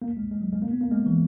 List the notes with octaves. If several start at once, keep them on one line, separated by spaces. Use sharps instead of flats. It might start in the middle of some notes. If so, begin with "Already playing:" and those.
A#3
G#3
G#3
F#3
G#3
A#3
B3
A#3
G#3
E3